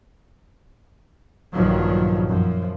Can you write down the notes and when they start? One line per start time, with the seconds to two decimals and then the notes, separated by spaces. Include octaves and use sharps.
1.53 A#1 G2 D#3 F3 F#3
2.28 F#2 F3